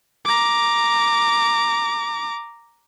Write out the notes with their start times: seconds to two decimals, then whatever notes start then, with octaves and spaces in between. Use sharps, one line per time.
0.25 A#5 D6